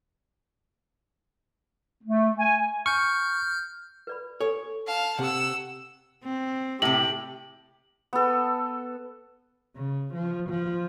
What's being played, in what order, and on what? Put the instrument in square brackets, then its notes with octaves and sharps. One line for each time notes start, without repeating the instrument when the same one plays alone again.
[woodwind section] A3
G#5
[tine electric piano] C#6 [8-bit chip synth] F6 G6
[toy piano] B4 D5 B5
[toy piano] A4 G#5 [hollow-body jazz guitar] C#5
[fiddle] F5 A5
[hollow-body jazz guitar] C3 [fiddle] F#5 E6
[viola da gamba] C4
[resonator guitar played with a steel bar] A2 C3 [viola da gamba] G4 [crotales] F#7
[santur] B3 A4
[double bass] C#3
F3
F3